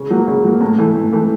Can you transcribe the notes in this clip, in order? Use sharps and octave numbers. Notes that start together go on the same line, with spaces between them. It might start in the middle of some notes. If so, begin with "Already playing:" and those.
Already playing: C#3
F#3 A#3
C#3
F#3 A#3
A2
E3 A3
A2
E3 A3